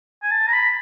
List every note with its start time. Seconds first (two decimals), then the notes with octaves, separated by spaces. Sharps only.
0.23 G#5
0.31 A5
0.48 A#5
0.53 B5